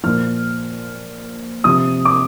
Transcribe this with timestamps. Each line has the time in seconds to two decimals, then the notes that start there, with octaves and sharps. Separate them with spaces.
0.03 A#2 F3 F6
1.64 C3 F3 D#6
2.05 D6